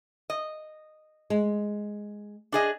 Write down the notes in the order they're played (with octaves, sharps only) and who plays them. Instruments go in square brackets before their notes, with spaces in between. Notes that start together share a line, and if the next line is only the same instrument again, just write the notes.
[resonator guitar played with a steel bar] D#5
[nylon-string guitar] G#3
[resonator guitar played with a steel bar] D4 G#4 D#5